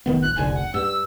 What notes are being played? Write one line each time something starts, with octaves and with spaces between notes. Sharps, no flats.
F1 D#3 B3
A#1 F#6
F1 C2 D3 G#5
F#5
G2 E6